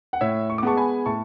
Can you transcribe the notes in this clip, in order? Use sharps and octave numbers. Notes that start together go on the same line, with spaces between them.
F#5
A2 C#5 E5
C#6
D6
G#3 B3 A5 C#6
G#5 B5
A2 A5 C#6